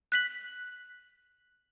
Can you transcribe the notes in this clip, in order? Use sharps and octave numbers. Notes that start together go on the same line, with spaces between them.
F#6 B6 F#7